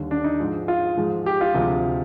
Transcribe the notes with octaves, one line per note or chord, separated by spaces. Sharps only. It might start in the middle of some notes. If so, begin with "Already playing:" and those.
Already playing: D#2 D3 G3
D4
D#4
G#2 F3 G#3
F4
G#2 F3 G#3
G4
F4
D2 C3 F3 G#3